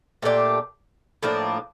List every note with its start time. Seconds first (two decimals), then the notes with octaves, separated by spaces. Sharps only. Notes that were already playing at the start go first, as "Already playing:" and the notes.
0.22 A#2 A3 D4 G4
1.23 A2 F3 A#3 D4